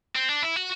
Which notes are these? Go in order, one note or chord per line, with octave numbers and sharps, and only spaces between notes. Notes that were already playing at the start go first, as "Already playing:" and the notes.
C4
D4
E4
F#4